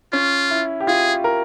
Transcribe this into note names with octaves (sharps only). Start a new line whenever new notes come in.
C#4 F4
E4
G4
F4 G#4
A#4